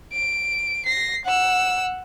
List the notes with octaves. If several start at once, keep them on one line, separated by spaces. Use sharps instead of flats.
D7
A#6 C7
F#5 E6